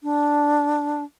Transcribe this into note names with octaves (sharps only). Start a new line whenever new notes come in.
D4